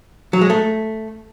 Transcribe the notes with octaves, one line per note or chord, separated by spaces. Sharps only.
F#3
G#3
A3